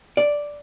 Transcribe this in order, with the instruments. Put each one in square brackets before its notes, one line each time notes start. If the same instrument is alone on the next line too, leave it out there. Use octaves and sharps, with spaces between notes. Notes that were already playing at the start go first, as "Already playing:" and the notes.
[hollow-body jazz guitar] D5